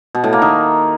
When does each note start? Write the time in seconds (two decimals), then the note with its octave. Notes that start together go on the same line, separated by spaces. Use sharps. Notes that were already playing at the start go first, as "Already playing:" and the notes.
0.15 B2
0.24 A2
0.33 A#3
0.42 D#3